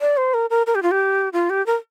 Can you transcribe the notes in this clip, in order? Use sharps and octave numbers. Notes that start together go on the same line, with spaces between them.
D5
C5
A#4
A#4
A#4
G4
F4
G4
F4
G4
A#4